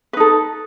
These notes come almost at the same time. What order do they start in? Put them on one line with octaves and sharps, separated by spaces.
B4 D#4 A4